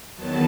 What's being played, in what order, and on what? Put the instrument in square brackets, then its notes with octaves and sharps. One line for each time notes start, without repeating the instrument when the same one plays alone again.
[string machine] E2 D#3 F#3 B3 A5